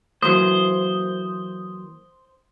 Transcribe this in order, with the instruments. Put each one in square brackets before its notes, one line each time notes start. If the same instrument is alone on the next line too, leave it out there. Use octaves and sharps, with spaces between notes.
[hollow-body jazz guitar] E3 F#3 A#3 [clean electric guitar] C5 [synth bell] D#6